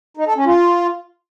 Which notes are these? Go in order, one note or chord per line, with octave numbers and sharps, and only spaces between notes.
D#4
A4
C#4
F4